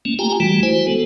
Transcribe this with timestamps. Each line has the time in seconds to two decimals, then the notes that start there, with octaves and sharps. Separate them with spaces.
0.05 A3 A#3 C#4
0.19 F4 G4 G5 G#5 A#5
0.40 E3 G3 A3 F#4
0.63 E4 F#4 C5 G#5
0.87 G#3 B3 A4